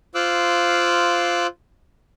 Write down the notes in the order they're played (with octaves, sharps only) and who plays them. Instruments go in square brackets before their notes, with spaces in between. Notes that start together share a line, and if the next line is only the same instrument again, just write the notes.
[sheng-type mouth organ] F4 C5 F5 D6 E6 F#6